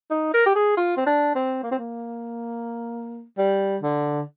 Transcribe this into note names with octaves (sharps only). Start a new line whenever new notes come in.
D#4
A#4
G4
G#4
F4
C4
D4
C4
A#3
C4
A#3
G3
D3